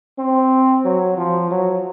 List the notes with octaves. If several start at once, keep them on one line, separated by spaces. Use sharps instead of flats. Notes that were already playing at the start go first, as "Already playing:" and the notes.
C4
F#3
F3
F#3